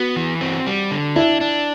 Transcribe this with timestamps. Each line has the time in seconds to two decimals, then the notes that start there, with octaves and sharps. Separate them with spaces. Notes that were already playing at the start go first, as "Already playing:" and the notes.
Already playing: B3 F#4
0.16 E3
0.41 C4
0.67 G3
0.91 D3
1.16 D4 E4
1.41 D4